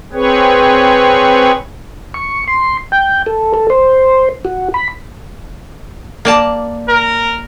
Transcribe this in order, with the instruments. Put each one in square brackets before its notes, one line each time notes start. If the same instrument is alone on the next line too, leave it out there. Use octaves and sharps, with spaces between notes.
[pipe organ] C4 G#4 B4 C#5
[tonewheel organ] C#6
C6
G5
A4
A4
C5
F#4
B5
[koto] A#3 D5 A5
[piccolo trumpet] A#4